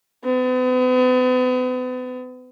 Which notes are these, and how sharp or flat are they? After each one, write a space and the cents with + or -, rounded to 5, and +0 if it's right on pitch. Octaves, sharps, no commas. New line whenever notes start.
B3 +40